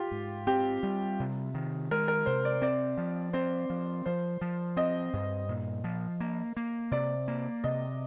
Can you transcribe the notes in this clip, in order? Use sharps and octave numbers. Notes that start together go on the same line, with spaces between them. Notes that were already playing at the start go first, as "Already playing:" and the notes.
Already playing: F4 G4
G#2
C4 G4
G3
C3
D#3
G#3 A#4
A#4
C3 C5
D5
C4 D5
F3
C4 C5
F3
F3 C5
F3
C4 D#5
G2
A#2
F3
A#3
A#3
C3 D5
A#3
C3 D#5